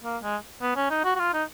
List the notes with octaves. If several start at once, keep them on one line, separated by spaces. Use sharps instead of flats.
A#3
G#3
B3
C#4
D#4
F#4
F#4
F4
D#4